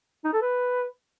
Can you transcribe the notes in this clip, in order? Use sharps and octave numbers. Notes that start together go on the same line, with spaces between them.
D#4
A4
B4